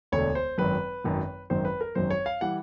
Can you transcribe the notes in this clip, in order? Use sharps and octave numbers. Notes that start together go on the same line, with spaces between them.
E1 D2 D3 C#5
C5
G#1 F#2 D#3 F#3 B4
G#1 F#2 D#3 F#3
G#1 F#2 D#3 F#3 C5
B4
A#4
G#1 F#2 D#3 F#3 C5
C#5
F5
E3 G3 F#5